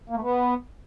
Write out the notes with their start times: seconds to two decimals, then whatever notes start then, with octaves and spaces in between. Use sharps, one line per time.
0.10 A#3
0.16 A3
0.22 B3